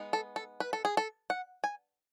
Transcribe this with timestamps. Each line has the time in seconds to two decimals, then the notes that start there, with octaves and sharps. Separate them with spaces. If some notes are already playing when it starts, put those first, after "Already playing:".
Already playing: G#3 B3 D#4
0.13 A4
0.36 A4
0.60 B4
0.73 A4
0.85 G#4
0.97 A4
1.30 F#5
1.64 G#5